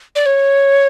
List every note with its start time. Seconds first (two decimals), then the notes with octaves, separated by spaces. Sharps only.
0.16 D5
0.26 C#5